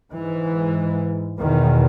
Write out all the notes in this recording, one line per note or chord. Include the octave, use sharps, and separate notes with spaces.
G#2 E3
E2 B2 D#3